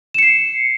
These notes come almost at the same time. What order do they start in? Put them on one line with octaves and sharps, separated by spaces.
E7 C#7 C7